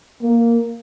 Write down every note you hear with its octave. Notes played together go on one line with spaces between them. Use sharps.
A#3